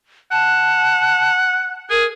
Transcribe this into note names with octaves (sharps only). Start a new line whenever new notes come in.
F#5 A5
G#4 A#4